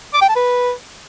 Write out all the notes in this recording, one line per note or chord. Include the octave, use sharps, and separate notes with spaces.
D6
G5
A5
B4